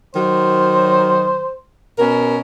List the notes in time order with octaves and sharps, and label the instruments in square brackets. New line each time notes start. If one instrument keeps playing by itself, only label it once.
[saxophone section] D#3 F#3 [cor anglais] C5
[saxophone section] B2 C#4 A#4